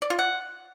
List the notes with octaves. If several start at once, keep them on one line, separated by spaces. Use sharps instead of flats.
D5
F4
F#5